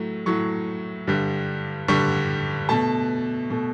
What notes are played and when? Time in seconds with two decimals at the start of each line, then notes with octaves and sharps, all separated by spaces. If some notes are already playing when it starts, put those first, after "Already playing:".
Already playing: A2 F#3 A3
0.26 A2 F#3 A3 C#6
1.07 G2 D3 G3
1.88 G2 D3 G3 C#6
2.69 B2 A3 A5
3.50 B2 A3